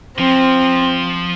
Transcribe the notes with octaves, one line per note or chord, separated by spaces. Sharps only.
F3 C4